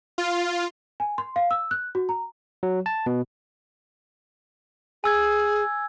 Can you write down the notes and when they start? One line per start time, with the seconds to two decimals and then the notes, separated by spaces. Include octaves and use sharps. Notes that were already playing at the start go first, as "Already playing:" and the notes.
0.18 F4
1.00 G#5
1.18 C6
1.36 F5
1.51 E6
1.71 F#6
1.95 F#4
2.09 A#5
2.63 F#3
2.86 A5
3.06 B2
5.04 G#4 G#5 E6 G#6